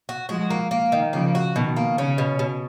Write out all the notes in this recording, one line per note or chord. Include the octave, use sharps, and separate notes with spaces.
F#4
F3 G#3 F#4
A#3
A#3
D#3
C#3 F3 A#3
F#4
B2 D#3
A#3
C#3 C#4
B2
B2